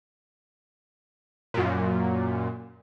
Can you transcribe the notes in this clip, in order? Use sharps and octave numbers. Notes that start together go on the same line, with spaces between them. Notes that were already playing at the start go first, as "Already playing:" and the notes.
F#2 A#2